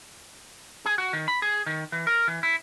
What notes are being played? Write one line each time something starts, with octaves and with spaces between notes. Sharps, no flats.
G#4
F#4
D#3
B5
G#4
D#3
E3
A#4
E3
E4